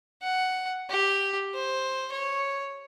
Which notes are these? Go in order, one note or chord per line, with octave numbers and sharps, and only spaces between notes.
F#5
G4
C5
C#5